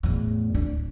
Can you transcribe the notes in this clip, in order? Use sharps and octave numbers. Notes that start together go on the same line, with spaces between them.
E2 A2
D1 D4